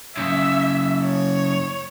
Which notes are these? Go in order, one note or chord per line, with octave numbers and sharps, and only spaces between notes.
F#2 C#3 E5
C#5